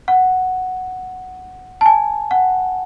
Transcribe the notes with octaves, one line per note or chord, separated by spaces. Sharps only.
F#5
A5
G#5
F#5